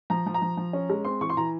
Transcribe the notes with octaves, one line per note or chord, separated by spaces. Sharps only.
F3 A#5
F3
A#5
F3
F3
C#4
G#3
C4 C6
E3 C#6
C6
E3 A#5